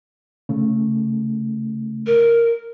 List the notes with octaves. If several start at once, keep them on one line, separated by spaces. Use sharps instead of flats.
C#3 A3
A#4